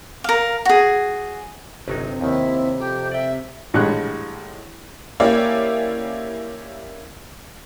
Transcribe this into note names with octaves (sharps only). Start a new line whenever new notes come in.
A#4 F5
F#4 G#4
G1 C3 F#3 D#4
D#2 D#3 C4 E4
F2 G4
D5 E5 G5
A1 A2 D3 G3 G#3 F#6
A#3 C#4 E4 G4 D5 F5